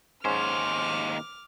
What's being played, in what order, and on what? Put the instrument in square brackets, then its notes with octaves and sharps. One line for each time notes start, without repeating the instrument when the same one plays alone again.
[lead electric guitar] D#2 C5 [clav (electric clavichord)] G#2 C#4 [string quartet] D6 F6